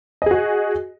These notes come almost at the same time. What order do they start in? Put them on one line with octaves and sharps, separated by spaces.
D#5 G#4 F#4